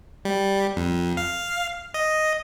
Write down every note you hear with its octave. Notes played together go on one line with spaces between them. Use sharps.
G3
F2
F5
D#5